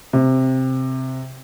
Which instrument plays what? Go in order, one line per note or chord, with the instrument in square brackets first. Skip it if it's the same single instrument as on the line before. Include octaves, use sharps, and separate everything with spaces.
[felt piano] C3